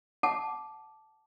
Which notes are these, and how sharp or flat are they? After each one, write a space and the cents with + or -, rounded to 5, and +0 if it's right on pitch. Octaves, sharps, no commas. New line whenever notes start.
F#5 +20 A5 -15 D6 +0